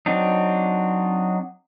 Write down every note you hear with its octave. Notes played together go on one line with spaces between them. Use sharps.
F#3 C4 D4 D#4